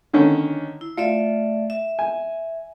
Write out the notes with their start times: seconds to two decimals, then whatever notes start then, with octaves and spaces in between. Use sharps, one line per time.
0.13 D3 D#3 C#4
0.81 E4
0.97 A3 F4 D5 E5
1.70 E5
1.99 G#5